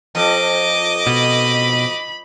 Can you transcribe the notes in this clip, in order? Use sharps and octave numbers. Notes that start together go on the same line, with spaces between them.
F2 D#5 D6
B2 B5